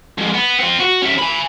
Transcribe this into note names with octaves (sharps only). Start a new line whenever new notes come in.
F2 G#2
B3
C4 F4
F#4
C#4 E5
G#5 B5